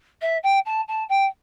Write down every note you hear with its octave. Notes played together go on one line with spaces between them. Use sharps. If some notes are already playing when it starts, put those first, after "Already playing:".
E5
G5
A5
A5
G5